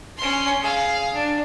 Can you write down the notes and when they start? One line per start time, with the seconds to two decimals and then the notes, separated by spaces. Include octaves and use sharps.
0.17 C#4 C6
0.61 G#4 F5
1.14 D4